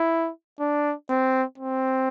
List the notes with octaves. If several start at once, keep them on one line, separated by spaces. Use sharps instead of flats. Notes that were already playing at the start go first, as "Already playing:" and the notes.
Already playing: E4
D4
C4
C4